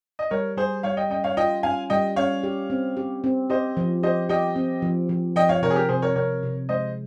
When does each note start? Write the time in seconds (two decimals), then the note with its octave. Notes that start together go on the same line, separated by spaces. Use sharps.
0.19 D#5
0.31 G3 A#4 C#5
0.57 G3 G#4 C5
0.83 G3 C#5 F5
0.97 D#5 G5
1.10 C#4 D#5 G5
1.24 C#5 F5
1.37 F4 D#5 G5
1.63 C#4 F5 G#5
1.90 G3 D#5 G5
2.16 C#4 C#5 F5
2.43 G4
2.70 C4
2.97 G4
3.24 C4
3.50 G4 C5 D#5
3.77 F3
4.03 G4 C5 D#5
4.29 G4 D#5 G5
4.56 C4
4.82 F3
5.09 F3
5.36 F3 D#5 G5
5.49 C#5 F5
5.62 C3 A#4 C#5
5.71 G#4
5.75 G4 A#4
5.89 C3 G#4 C5
6.02 A#4 C#5
6.15 C3 A#4 C#5
6.43 C3
6.69 G#3 C5 D#5